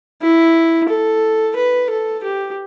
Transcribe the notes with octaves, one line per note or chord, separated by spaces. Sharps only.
E4
A4
B4
A4
G4